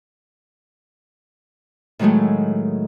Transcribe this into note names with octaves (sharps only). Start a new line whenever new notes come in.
A2 D#3 F#3 G#3 A3